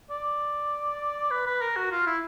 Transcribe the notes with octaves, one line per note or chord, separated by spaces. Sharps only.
D5
B4
B4
A#4
F#4
F4
E4